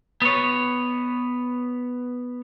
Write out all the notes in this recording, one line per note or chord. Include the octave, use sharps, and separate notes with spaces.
B3 C#5